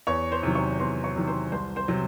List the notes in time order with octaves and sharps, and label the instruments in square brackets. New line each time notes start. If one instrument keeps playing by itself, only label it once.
[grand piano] E2 C#5 C#6
C5 C6
C3 D#3 F#3
C#5 C#6
E2 C5 C6
C#5 C#6
C3 D#3 F#3
C5 C6
C2 C5 C6
C5 C6
C3 F#3